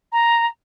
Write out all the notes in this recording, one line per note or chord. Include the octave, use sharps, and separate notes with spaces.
A#5